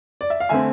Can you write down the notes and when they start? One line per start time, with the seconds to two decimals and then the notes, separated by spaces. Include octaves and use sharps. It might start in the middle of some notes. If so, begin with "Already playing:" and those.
0.21 D5
0.30 E5
0.40 F5
0.49 D3 A3 C4 E5 G#5